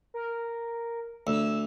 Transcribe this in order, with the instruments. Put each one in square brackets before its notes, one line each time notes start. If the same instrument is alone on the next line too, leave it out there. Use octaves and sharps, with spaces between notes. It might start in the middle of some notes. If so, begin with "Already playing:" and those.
[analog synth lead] A#4
[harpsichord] D2 [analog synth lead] E6